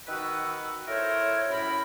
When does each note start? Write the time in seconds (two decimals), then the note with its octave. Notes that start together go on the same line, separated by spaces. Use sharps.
0.07 D#3 F#4 B4 F#5 E6
0.88 E4 A4 A#4 C5 C#5
1.49 F#2 A2 A#4 B5